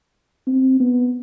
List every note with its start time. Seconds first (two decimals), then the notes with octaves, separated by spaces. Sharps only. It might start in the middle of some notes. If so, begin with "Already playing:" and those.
0.47 C4
0.80 B3